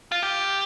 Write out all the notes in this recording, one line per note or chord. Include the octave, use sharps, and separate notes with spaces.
F4
G4